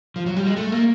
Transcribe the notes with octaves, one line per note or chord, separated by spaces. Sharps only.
F3
F#3
G3
G#3
A3
A#3